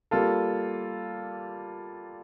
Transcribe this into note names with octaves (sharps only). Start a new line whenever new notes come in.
G3 A#3 F4 A4